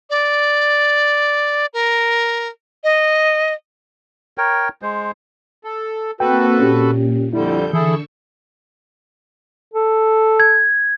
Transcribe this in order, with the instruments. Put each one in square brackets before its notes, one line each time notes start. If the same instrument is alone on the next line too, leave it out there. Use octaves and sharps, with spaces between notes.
[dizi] D5
A#4
D#5
[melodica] A#4 C#5 G5
G#3 C5
[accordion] A4
[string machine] A#3 C4 [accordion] F#4 A4 B4 [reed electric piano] G5
[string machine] A#2 [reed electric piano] C#4 G4
[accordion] F2 D3 G3 [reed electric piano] E4 [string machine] A4 G6
[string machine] D3 C#6 E6 [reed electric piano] E3 [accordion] E4 G#4 A4
[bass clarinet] A4
[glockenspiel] G#6